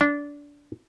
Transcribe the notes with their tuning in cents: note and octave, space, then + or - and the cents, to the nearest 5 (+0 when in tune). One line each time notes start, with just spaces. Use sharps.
D4 -20